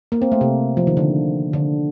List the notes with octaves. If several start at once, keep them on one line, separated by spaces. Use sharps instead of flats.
A#3
C4
A3
C3
F3
D#3
D3
D3